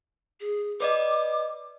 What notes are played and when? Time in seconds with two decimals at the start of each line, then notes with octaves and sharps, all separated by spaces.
0.40 G#4
0.80 B4 D5 D#5 D6